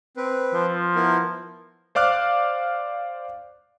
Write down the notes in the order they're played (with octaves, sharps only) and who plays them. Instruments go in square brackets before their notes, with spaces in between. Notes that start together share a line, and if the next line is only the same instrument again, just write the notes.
[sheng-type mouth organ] C4 B4
[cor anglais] F3
[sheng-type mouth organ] B3 E4 A#4
[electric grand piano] C5 D5 F5 D6 F6 F#6